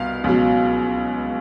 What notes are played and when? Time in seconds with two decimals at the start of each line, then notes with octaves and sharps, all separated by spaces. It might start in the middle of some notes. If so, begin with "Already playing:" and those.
Already playing: C2 B2 F5
0.24 C#2 B2 F#3